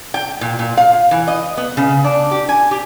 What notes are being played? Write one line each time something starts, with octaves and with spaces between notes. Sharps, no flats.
G5
A#2
A#2
F5
E3
D#5
B3
C#3
D4
G4
G#5
G4